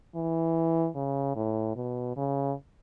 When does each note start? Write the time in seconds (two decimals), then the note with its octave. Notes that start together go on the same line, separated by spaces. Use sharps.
0.15 E3
0.95 C#3
1.36 A2
1.76 B2
2.17 C#3